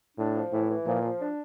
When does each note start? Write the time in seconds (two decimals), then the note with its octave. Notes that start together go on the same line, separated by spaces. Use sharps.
0.17 A2 D4
0.34 F3
0.51 A2 E3
0.68 E3
0.86 A#2 F3
1.02 F3
1.19 D4